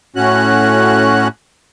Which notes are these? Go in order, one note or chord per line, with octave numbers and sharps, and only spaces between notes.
A2 C#4 F#4 F#6